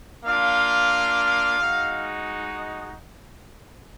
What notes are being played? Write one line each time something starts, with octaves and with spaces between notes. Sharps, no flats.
A#3 D4 F4 F5
G#3 D#4 F#4